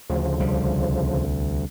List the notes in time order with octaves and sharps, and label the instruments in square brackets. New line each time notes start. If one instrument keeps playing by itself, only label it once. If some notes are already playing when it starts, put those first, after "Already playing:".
[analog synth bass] D2 [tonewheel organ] C#3 F3
[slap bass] C2 G3